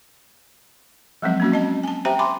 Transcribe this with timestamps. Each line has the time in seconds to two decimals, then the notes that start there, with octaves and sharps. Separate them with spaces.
1.22 F3 F#3 G#3 C4
1.40 A#3 C#4 F#4
1.52 C4 D#5 A5
1.83 G#5 A5
2.05 G4 C5 E5 G5 A#5
2.19 G#5 B5 C6 D6